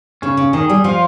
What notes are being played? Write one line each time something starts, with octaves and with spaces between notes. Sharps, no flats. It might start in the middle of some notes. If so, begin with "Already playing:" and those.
C#3 C#4
C#3
D#3 G#4
G3
F3 F4